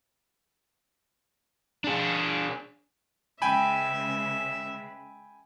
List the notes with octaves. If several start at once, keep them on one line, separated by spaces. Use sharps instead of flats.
D4 G#4
C#3 G#3 B4 E5 G5 G#5 B5